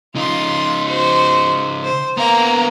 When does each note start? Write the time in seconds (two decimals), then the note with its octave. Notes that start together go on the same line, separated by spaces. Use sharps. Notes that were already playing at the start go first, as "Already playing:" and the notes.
0.15 C#3 D#4 F4 C6
0.86 F#4 C5
1.84 C5
2.17 A#3 B3 F5 A#5